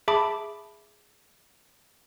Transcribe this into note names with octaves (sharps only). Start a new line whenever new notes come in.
G#4 E5 A5 B5 D6